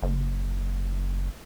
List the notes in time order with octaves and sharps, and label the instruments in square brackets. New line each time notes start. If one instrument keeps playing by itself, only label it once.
[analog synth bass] F#1